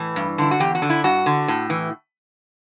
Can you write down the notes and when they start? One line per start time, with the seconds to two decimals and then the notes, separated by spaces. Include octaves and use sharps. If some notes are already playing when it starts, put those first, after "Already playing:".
Already playing: A2 E3
0.16 G2
0.38 D3 E4
0.51 F#4
0.60 E2 G4
0.75 F#4
0.82 D3
0.90 E4
1.04 G2 F#4
1.26 D3
1.48 A2
1.70 E3